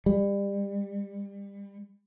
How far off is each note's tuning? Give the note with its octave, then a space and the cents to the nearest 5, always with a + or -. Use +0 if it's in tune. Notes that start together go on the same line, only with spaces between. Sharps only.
G3 +30